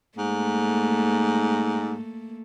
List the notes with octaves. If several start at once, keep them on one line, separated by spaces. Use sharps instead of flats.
G#2 A3 A#3